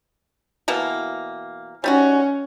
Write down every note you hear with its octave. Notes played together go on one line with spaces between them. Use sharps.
B2 E3 A#3
G3 C#4 D#4 F#4